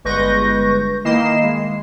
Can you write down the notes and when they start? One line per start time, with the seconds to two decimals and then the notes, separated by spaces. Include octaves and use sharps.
0.04 G1 G#3 B4 C#6 G6 A#6
1.05 D#3 A#3 E4 D#5 C7 E7
1.43 G#3